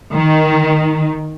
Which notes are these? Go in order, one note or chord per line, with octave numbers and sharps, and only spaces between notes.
D#3